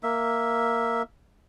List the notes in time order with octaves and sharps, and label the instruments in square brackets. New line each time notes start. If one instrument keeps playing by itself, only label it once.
[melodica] A#3 E5